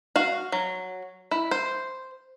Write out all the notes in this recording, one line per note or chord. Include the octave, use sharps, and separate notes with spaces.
F#4 F5
F#3
E4
C5